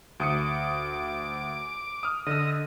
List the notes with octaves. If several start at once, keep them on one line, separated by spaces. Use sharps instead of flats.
D2 D6 D#6 C#7
D#6 F6
D3 D#5 E6